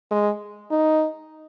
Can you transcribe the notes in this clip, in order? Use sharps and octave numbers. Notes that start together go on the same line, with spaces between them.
G#3
D#4